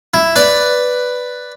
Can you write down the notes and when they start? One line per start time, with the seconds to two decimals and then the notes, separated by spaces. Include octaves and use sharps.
0.14 E4
0.36 B4 D5